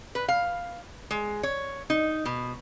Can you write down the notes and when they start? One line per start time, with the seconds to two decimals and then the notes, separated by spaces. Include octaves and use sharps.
0.15 B4
0.28 F5
1.11 G#3
1.43 C#5
1.90 D#4
2.25 B2